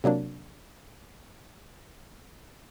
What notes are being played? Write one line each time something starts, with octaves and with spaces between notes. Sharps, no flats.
C3 F#3 A#3 D4